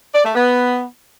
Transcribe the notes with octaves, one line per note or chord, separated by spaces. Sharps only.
D5
A3
B3